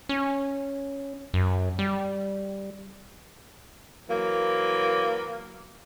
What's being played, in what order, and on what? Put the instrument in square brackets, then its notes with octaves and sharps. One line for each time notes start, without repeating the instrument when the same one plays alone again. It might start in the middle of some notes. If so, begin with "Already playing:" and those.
[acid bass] C#4
F#2
G3
[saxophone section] E3 F#3 A#3